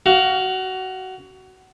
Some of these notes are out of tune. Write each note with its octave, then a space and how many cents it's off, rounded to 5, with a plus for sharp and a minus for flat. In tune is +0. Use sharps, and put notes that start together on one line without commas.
F#4 +20 F5 +0